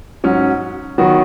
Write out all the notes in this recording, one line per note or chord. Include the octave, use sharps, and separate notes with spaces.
G#2 F#3 C#4
D#3 F#3 B3 F#4